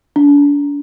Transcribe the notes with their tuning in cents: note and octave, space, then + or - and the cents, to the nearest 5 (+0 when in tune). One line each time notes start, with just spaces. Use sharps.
D4 -35